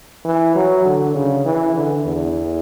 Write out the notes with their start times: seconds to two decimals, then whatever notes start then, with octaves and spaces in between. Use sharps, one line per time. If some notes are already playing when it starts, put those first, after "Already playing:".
0.25 E3
0.55 F#3
0.85 D3
1.15 C#3
1.45 E3
1.75 D3
2.05 E2